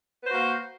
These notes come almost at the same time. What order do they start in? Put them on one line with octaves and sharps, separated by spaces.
B4 C5 F#4 A#3